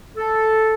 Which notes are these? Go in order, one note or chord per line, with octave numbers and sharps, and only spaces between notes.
A4